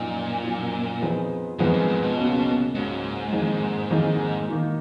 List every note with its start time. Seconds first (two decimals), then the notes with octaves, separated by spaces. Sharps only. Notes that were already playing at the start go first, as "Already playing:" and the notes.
Already playing: F#2 A#2 F3 A#3 D#4
0.43 F#2 F3 A#3 D#4
1.01 F2 F3 B3 D#4 G#4
1.59 F2 G#2 F3 B3 D#4 G#4
1.74 F#2
1.87 G#2
2.03 B2
2.17 C#2 C#3 F#3 A#3 C#4
2.75 C#2 G#2 C#3 F#3 A#3 C#4
3.32 F2 D#3 A#3 D#4 G#4
3.90 F2 D#3 A#3 D#4 G#4
4.49 D#3 A#3 D#4